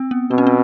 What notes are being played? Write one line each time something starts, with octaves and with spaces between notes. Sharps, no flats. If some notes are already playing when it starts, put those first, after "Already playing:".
Already playing: C4
B3
B2 C4
C#4
C4